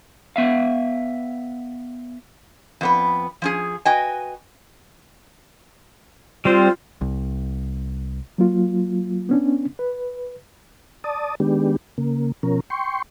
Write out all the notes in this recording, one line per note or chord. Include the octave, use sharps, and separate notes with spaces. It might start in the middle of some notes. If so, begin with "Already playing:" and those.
B3 E5 F5
F2 B3 B4
F3 C#4 G#4
F#4 B4 D#5 G5 G#5
G3 C4 F4 C5
C2
F#3 A#3 F4
B3 C#4 D4
B4
D5 A5 D#6
D#3 G#3 B3 D4 G4
C#3 A#3
B2 F3 C#4 A#4
G5 C6 C#6